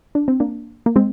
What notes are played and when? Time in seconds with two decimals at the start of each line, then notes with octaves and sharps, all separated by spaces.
0.15 D4
0.28 C4
0.40 A#3 D4
0.86 A#3
0.96 G#3 C4